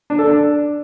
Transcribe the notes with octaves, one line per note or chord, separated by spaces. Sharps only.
D4
A4
D4